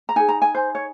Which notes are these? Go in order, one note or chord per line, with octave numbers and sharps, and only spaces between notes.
A#5
D#4 G#4 G#5
A#5
G#5
C5
C#5